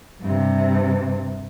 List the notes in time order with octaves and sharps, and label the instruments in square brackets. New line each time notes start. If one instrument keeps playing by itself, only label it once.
[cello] G2 C3